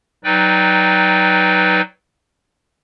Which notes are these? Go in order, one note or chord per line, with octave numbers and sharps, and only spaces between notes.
F#3 D#4 B4 D5 G5